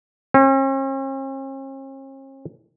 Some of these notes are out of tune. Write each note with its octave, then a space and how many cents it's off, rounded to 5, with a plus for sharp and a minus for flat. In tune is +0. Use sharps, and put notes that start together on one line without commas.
C#4 -45